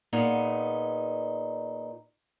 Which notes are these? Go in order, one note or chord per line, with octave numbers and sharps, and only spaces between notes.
A#2 B3 D#4 G#4